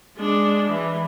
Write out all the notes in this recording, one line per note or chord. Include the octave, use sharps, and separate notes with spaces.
G#3 D4
E3